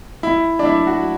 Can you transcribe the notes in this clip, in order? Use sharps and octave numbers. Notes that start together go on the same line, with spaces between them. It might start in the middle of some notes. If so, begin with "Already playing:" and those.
E4
D4
E4
F#4